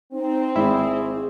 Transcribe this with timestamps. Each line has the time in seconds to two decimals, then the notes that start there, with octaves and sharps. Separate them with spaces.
0.12 C4 D#4
0.56 G#1 E4 G#4